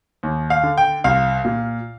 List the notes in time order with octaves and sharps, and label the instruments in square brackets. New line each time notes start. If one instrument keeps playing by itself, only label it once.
[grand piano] D#2
F5
D3
G5
C2 F5
A#2